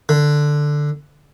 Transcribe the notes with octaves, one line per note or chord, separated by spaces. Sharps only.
D3